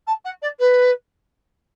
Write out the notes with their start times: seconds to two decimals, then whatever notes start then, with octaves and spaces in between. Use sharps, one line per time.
0.07 A5
0.24 F#5
0.42 D5
0.59 B4